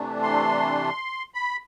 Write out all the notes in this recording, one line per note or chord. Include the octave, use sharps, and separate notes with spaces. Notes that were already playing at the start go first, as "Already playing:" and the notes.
Already playing: C3 E3 A3 D4
C6
B5